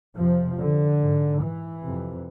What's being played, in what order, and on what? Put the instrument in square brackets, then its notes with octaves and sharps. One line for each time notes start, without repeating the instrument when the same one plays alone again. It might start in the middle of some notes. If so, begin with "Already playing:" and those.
[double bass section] F2 C3 F3
D3
G#2
E3
F2 C3